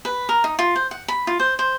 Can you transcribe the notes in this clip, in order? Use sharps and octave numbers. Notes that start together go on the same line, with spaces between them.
B4
A#4
D#4
F4
C5
F#5
B5
F4
C5
C5